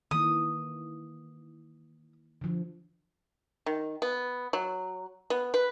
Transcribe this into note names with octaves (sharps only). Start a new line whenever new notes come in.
D#3 E3 A#3 D#6
D3 F3
D#3
B3
F#3
B3
B4